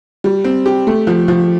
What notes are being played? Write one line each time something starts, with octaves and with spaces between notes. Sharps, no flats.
G3
C4
G4
A3
F3
F3